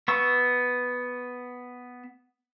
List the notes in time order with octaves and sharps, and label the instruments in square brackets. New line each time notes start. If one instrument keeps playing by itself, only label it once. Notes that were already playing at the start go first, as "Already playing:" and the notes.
[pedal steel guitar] B3 C#6 E6